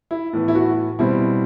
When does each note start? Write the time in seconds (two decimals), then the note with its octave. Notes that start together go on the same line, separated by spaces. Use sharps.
0.11 E4
0.33 A2 E3 B3
0.48 E4
0.55 F#4
0.99 B2 G3 C4 E4